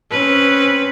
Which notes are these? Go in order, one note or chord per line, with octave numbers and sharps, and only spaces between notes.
C4 C#4 B4